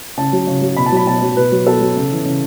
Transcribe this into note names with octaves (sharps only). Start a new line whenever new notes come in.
C#3 A5
F#3
C#3
F#3
B2 B5
A5
F#3 B5
B2 A5
F#3
B2 B4
F#3
B2 A4
F#3
C#3
E3
C#3